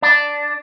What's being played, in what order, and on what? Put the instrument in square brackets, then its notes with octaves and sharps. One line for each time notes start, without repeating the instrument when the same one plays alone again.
[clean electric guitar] D4